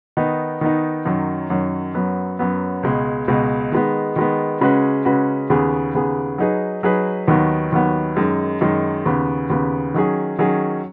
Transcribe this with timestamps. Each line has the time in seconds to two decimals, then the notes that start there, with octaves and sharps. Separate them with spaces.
0.17 D#3 B3 D#4
0.61 D#3 B3 D#4
1.05 F#2 D#3 F#3
1.50 F#2 D#3 F#3
1.94 F#2 F#3 B3
2.39 F#2 F#3 B3
2.83 C#2 B2 G#3
3.28 C#2 B2 G#3
3.72 D#3 G#3 B3
4.16 D#3 G#3 B3
4.61 C#3 G#3 C#4 F#4 B4
5.05 C#3 G#3 C#4 F#4 B4
5.50 D#2 C#3 B3 G#4
5.95 D#2 C#3 B3 G#4
6.38 F#3 D#4 G#4 B4
6.83 F#3 D#4 G#4 B4
7.28 D#2 D#3 F#3 B3
7.72 D#2 D#3 F#3 B3
8.16 F#2 D#3 G#3
8.61 F#2 D#3 G#3
9.06 D#2 C#3 B3
9.50 D#2 C#3 B3
9.94 D#3 F#3 C#4 G#4
10.38 D#3 F#3 C#4 G#4